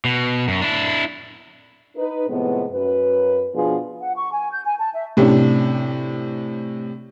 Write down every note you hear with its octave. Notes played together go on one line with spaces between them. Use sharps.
B2
F#2
D4 E4
D#4 B4
A2 C3 F3 G#3 B3
F#2 B4
B2 F3 B3 D4 F4 G#4
F#5
C#6
G#5
G6
G#5
A5
E5
A2 C3 C#4 D4